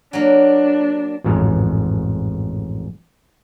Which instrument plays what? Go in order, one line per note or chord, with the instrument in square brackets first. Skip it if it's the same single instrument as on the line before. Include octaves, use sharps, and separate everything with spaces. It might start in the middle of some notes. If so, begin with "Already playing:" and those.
[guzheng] F#3 A#3 [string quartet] D4
[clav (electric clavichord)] A1 F2 G#2